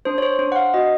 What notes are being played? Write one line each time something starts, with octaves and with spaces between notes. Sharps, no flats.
D4 C5
C#5
C5
D4 C5
F#5
F5
F#4 D#5